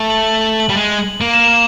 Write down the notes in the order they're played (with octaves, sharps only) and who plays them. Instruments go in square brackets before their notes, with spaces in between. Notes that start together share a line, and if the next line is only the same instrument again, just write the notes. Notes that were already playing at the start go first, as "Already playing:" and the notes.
Already playing: [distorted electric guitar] A3
[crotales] F#7
F#7
F#7
F#7
[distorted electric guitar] G3
G#3
A#3
[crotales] E7
F7